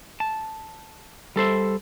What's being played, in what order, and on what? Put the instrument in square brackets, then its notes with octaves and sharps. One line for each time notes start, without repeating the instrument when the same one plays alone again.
[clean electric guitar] A5
G3 A4 C5 E5